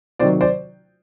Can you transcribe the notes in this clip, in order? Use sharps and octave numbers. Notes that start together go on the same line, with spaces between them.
C3 D#3 F#3 C5 D5
C5 D5